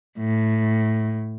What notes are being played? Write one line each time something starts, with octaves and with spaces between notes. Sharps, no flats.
A2